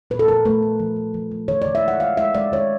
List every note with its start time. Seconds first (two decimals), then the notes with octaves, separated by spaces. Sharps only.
0.10 A#2 B4
0.19 A4
0.28 F3 A#4
0.45 A3 B4
0.63 A3
0.79 F3
0.96 F3
1.14 F3
1.32 A3
1.48 D#3 C#5
1.62 D5
1.66 D#3
1.75 E5
1.84 G#3 F#5
2.00 D#3 F5
2.17 G#3 E5
2.35 G#3 D5
2.52 D#3 C#5